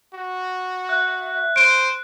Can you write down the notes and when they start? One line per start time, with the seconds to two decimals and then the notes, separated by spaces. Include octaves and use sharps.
0.14 F#4
0.89 E5 F#6
1.56 C5 D7